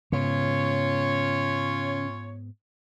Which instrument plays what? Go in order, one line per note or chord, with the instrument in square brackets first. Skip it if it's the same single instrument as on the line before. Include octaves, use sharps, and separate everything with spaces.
[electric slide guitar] G#2 B3 [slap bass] C#3 [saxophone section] C#4 F4 C#5